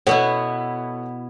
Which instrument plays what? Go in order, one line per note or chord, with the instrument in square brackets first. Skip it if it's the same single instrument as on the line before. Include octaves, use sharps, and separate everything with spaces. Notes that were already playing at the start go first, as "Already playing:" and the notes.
[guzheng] B2 B3 E4 [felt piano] A4 C#5 F#5